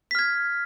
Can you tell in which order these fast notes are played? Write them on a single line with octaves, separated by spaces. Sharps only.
B6 F6 G#6